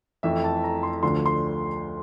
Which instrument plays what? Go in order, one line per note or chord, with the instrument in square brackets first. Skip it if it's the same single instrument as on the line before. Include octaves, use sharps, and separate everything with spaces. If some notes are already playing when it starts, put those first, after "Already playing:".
[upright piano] F2 E3 A3 E5
A5
A#5
C6
D2 D3 F3 A3 C6
C6